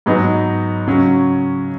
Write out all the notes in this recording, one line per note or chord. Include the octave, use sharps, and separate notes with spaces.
G#2 F#3 B3 D#4
C#3 F#3 C#4